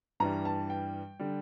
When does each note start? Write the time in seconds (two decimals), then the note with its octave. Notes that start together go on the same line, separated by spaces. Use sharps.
0.20 G2 E3 G3 A#5
0.45 A5
0.70 G5
1.19 D3 G3